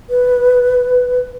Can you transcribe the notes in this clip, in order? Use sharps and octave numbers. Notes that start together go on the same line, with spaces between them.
B4